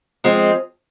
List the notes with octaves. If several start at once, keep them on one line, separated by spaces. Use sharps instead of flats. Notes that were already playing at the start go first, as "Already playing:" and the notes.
F3 G#3 C4